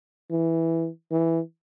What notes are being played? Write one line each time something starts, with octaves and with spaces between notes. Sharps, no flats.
E3
E3